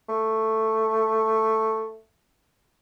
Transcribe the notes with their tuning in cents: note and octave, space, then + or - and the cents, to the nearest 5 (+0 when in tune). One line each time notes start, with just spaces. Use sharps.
A3 +5